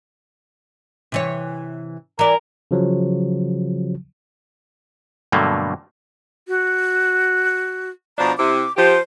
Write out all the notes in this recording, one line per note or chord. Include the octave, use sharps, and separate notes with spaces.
C3 E3 C#5
E3 A#4 D5
C#3 F3 F#3
G2 B2 D3 F#3 A3 A#3
F#4
B2 F3 D4 A#5
C3 E4 D6
F3 G4 C5